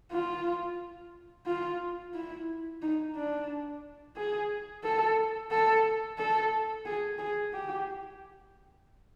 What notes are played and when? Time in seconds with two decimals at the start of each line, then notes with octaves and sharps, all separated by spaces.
0.12 F4
1.46 F4
2.14 E4
2.82 D#4
3.16 D4
4.16 G#4
4.84 A4
5.51 A4
6.18 A4
6.85 G#4
7.19 G#4
7.53 G4